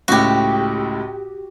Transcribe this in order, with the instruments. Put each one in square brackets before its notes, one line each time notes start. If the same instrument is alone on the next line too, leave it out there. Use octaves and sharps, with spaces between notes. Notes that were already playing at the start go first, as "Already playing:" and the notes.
[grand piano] C#2 A2 [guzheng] F#4 G4